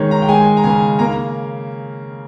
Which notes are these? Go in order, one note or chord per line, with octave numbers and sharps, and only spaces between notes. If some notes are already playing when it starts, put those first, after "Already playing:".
Already playing: D#3 G#3 C#5
A#5
G5
G#3 G#5
A#5
C#3 G#5
A#3 A#5